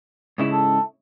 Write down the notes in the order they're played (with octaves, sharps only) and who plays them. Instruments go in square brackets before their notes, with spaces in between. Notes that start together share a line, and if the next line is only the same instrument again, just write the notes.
[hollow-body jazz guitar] G#2 C#3 E4
[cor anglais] A4